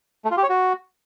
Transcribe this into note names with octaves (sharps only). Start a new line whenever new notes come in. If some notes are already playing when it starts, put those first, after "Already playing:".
A3
F4
G4
C#5
F#4